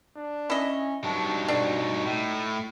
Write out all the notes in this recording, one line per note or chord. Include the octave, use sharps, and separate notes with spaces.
D4
C#4 E4 D#5
G2 F#3 D4 D#4
F2 B2 D4
A2